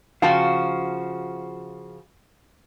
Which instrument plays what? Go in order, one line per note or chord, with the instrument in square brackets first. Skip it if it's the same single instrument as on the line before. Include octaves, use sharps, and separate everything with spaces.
[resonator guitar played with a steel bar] C#3 F3 F#4 [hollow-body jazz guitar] F5 G5 A5